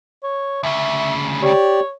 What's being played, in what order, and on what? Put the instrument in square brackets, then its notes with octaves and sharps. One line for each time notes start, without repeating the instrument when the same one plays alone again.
[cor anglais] C#5
[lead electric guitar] D2 C#3 [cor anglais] E5
[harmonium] G4 D5 [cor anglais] C#5